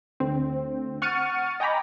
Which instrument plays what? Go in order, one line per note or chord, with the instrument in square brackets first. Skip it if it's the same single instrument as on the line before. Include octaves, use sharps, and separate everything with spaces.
[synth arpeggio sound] D2 C4
F#5 C#6 F6 A6 C#7 D#7
D#5 G5 G#5 A#5 B5 D6